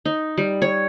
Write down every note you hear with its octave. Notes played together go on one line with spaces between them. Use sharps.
D#4
G3
C#5